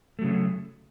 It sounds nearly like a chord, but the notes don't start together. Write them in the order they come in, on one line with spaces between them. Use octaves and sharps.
A3 F#3 C#3